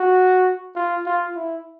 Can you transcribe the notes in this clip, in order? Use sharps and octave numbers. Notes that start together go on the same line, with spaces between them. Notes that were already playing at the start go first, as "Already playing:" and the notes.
Already playing: F#4
F4
F4
E4